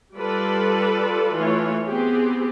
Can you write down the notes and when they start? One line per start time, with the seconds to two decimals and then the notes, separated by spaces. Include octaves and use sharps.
0.16 G3 F4 A4 B4 D5
1.36 E3 A3 F4 C#5
1.85 B3 C4 G4 G#4